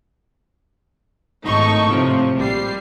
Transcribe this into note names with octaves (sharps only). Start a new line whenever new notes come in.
G#1 A2 D#4 A4 C#6
A2 C3 F3
A#1 G3 C7